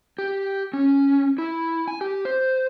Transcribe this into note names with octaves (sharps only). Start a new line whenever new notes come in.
G4
C#4
E4
G#5
G4
C5